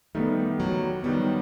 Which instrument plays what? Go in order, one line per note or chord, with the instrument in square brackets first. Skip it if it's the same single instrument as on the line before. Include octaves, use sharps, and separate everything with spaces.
[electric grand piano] D#3 G3 B3 [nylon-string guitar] A3
[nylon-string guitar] F#3
[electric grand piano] D#3 G3 B3 [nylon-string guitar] F#3